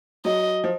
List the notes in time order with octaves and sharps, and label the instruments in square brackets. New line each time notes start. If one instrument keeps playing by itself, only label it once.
[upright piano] F#3 [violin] D#5
[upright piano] F3